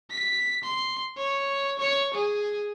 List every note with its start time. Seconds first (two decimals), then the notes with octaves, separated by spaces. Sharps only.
0.11 B6
0.64 C6
1.18 C#5
1.79 C#5 C#6
2.14 G#4